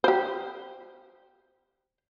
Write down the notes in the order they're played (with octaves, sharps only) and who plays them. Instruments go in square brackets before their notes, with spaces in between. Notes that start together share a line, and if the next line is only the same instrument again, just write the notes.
[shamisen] G4 C5